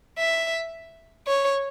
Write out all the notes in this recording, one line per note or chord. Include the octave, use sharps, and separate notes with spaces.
E5
C#5